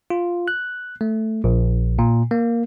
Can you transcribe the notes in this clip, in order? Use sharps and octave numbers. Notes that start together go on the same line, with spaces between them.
F4
F#6
A3
A#1
A#2
A#3